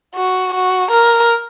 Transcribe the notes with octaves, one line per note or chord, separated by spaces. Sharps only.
F#4
F#4
A#4